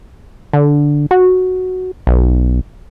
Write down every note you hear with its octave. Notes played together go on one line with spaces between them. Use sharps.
D3
F#4
B1